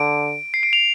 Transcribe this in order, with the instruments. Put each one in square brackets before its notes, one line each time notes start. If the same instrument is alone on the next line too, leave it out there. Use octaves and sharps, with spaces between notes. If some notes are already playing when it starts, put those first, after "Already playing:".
Already playing: [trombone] D3 [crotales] D7
[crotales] C7
D7
F7